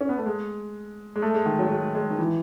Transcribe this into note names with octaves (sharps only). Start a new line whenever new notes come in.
C#4
B3
A3
G#3
G#3
A3
G#3
D#3
F#3
G#3
G#3
D#3
E3